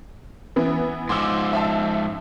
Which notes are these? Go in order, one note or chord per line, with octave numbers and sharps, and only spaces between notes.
E3 B3
G#2 F3 C6 D6 E6
E5 F5 A5